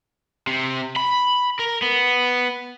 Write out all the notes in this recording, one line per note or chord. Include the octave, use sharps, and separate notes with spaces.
C3
B5
A#4
B3